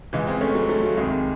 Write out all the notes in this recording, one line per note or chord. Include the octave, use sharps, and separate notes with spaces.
C#2 C#3 E3 G#3
G#3 C4
A3 C#4
F#3 A3
F#3 A3
F#3
C2 C3 D#3 G#3